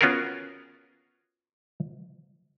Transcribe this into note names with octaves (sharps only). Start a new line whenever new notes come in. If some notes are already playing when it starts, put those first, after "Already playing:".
B3 C#4 F4 F#4 G#4 A#4